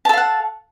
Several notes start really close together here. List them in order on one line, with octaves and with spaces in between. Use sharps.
A5 A4 F5 F#5